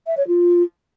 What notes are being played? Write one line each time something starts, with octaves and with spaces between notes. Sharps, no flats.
E5
C#5
F4